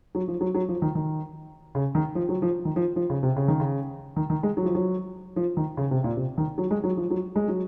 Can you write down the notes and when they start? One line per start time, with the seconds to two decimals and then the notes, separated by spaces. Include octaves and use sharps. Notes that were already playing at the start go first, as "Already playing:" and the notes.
0.15 F#3
0.28 F3
0.41 F#3
0.55 F#3
0.68 F3
0.82 D#3
0.95 D#3
1.75 C#3
1.95 D#3
2.15 F3
2.29 F#3
2.42 F3
2.65 D#3
2.76 F3
2.96 F3
3.10 C#3
3.23 C3
3.36 C#3
3.48 D#3
3.60 C#3
4.16 D#3
4.30 D#3
4.43 G#3
4.57 F#3
4.65 F3
4.75 F#3
5.36 F3
5.57 D#3
5.77 C#3
5.91 C3
6.04 A#2
6.17 C3
6.38 D#3
6.58 F#3
6.71 G#3
6.84 F#3
6.97 F3
7.10 F#3
7.36 G#3
7.48 F#3